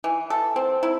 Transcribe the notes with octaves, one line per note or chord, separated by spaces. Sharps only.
E3
A4
C4
E4